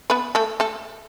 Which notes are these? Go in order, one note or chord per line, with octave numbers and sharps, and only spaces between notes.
B3 B4
A3 A4
A3 A4